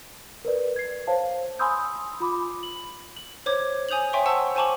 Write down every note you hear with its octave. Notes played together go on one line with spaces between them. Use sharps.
A#4 B4 D5
G#6 C7
C5 C#5 F5 A5
G#5 B5 C6 D#6 E6 G6
F4 B5 D6
F#7
F#7
C5 C#5 D6 G#6
G#5 D#6 G6 F7 F#7
C#5 E5 G5 G#5 C6 C#6
C5 F#5 A5 C#6 E6
C5 G#5 A5 C#6 D6 F#7